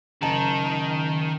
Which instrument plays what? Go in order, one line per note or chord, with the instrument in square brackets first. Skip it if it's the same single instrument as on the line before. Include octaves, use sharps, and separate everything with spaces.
[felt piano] F#1 A5 A#5 [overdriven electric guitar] D#3